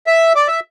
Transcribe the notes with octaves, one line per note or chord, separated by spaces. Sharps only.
E5
D5
E5